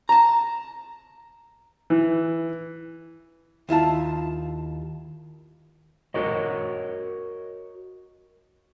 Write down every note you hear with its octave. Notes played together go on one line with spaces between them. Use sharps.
A5 A#5
E3
D#2 E4 F4 A5
F#4 A#4 C#5 D#5